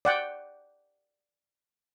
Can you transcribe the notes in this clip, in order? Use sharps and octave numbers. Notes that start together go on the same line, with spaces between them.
D5 F#5 G5